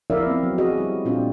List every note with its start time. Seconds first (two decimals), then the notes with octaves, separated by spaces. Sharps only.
0.10 F3 E4 A#4 D5 E5 F5
0.27 B3 C4
0.43 F#3
0.58 F#4 G#4 D#5
0.78 G3 E4
1.05 A#2 C4 D4 F4 C5